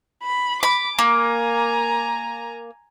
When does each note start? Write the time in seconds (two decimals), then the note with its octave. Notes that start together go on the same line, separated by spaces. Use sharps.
0.23 B5
0.63 B5 D6
0.99 A#3 G#5 A#5